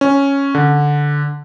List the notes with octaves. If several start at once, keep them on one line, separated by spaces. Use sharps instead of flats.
C#4
D3